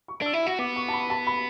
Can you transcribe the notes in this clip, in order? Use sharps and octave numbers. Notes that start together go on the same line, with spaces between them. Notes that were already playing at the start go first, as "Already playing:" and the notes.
C#6
D4 E6
E4
E6
F#4
B3 D6
C#6
A5
B5
A5
B5